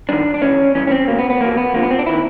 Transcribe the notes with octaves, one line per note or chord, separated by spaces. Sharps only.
G2 D#3 D4
D4
E2 C#3 E3 C#4
G2 E3 C#4
C#4
C4
C#2 B2 A#3
B3
B3
E2 B2 A#3
B3
F2 D3 F3 A#3
B3
C4
D4
D#3 E4